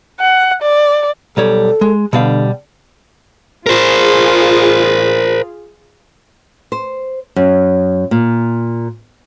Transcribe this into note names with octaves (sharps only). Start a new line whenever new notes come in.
F#5
D5
B1 G3 A4 C#5
G#3
B2 D3 G3 F5
F4 G#4 A#4 C5
C5
F#2
A#2